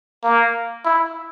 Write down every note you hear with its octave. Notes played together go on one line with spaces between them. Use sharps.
A#3
E4